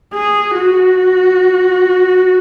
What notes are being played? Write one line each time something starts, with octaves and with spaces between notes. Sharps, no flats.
G#4
F#4